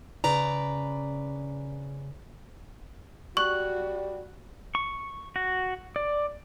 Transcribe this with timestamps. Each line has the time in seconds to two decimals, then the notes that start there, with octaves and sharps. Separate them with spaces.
0.24 C#3 B4 D5 A#5
3.37 G3 F#4 C#6 F#6
4.75 C#6
5.36 F#4
5.96 D5